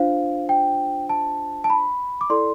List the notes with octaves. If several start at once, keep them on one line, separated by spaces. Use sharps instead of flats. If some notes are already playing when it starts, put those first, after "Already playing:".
Already playing: D4 F4 C5 F5
G5
A5
A5
B5
D6
E4 A4 D5 C6